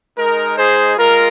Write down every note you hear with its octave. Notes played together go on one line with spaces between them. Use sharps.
G#3 D#4 A#4
G#4 C5
G#3 F4 A#4